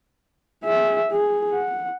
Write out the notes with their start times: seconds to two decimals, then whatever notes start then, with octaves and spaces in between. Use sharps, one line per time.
0.64 G#4 E5
1.11 G#4
1.53 F#5